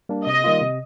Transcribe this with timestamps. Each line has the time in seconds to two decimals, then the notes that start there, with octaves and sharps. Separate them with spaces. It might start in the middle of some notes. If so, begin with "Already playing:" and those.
0.09 G3 A#3 D4
0.26 C3 D#5
0.44 D#3 G3 A#3 F4
0.61 C3